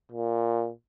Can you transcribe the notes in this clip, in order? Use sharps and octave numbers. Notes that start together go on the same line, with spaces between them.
A#2